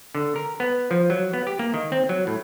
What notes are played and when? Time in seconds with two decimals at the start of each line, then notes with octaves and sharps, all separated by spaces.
0.15 D3
0.36 A#4
0.60 B3
0.91 F3
1.10 F#3
1.33 B3
1.47 G4
1.59 A#3
1.74 D#3
1.92 C4
2.09 F#3
2.27 A2